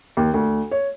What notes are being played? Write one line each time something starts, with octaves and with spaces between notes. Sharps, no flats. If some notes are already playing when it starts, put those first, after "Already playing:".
D#2
D2
C#5